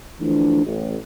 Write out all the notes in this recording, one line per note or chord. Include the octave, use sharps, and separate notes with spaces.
D3 E3 F3 A3 D4
A1